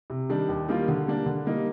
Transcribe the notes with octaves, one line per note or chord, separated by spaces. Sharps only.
C3
D#3 G3 D4
D#2
D#3 G3 A#3 F4
D3
G3 A#3 D4
D3
G3 A#3 D#4